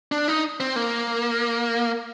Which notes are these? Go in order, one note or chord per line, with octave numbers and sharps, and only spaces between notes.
D4
D#4
C4
A#3